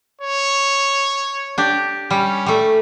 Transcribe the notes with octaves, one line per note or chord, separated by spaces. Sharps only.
C#5
D4 G4
G3 C#4
G3 A3